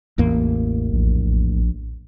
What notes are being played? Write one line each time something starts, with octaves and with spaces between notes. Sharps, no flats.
A1 E2 A#3
A#1